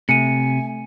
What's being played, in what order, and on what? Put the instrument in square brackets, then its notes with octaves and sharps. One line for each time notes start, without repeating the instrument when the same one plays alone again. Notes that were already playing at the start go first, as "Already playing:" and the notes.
[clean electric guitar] C3 [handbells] A3 [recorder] G#5 [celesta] C#7 D#7